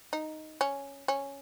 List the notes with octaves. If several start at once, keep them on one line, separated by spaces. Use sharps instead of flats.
D#4
C#4
C#4